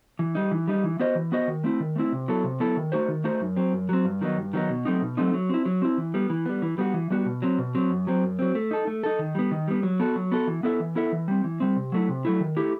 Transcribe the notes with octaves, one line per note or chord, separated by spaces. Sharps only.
E3
G3 D#4
E3
G3 D#4
E3
B3 F#4 C5 D#5
E3
B3 F#4 C5 D#5
D#3
A3 C4 E4
D#3
A3 C4 E4
C3
F#3 B3 E4 A4
C3
F#3 B3 E4 A4
D#3
A3 D#4 F#4 C5
D#3
A3 D#4 F#4 C5
F#2
F#3 C4
F#2
F#3 C4
G2
D#3 F#3 B3 D#4
G2
D#3 F#3 B3 D#4
B2
F#3 A3 C4 D#4
B2
F#3 A3 C4 D#4
F#3
C4 E4
F#3
C4 E4
E3
G3 B3
E3
G3 B3
E3
G3 B3 F#4
E3
G3 B3 F#4
B2
F#3 C4
B2
F#3 C4
F#2
F#3 C4
F#2
F#3 C4
A3
D#4 A4
A3
D#4 A4
D#3
G3 B3
D#3
G3 B3
F#3
B3 F#4 A4
F#3
B3 F#4 A4
E3
B3 E4 A4 E5
E3
B3 E4 A4 E5
E3
G3 C4
E3
G3 C4
C3
F#3 A3 E4
C3
F#3 A3 E4
D#3
A3 E4 G4